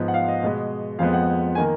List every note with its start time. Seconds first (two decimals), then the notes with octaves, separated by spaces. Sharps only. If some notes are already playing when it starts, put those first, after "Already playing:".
Already playing: G#2 F3 B3
0.08 F#5
0.14 F5
0.28 D#5
0.43 B2 G#3 B3
0.99 F2 F3 G#3 B3 F5
1.13 F#5
1.55 D#3 A#3 G#5